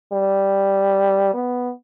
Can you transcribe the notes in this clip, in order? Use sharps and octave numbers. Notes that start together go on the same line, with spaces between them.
G3
B3